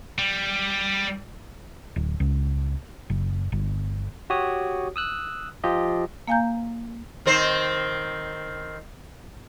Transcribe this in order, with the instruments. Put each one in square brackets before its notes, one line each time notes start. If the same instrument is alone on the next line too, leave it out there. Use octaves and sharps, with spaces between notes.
[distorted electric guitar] G3
[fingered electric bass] D1
C#2
F#1
G1
[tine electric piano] F#4 G4 C#5 D#6
D#6 E6 F#6
F3 F4 G4 D#5
[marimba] A#3 F5 G#5 A#5 G6
[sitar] D#3 C4 C5